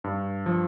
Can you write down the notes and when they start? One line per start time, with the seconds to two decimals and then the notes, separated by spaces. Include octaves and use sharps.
0.04 G2
0.46 F3